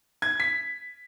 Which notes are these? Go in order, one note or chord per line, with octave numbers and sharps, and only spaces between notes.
G#6
B6